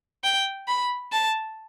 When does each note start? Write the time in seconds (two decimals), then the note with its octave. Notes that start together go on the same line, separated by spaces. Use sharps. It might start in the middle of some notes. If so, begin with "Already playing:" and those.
0.24 G5
0.68 B5
1.13 A5